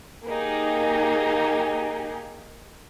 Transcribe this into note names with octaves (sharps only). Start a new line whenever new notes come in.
A#3 D#4 G4 G#4